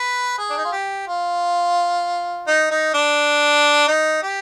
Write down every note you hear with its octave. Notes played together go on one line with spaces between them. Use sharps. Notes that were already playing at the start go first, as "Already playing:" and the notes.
Already playing: B4
G#4
D4
D#4
F4
G4
F4
D#4
D#4
D4
D#4
G4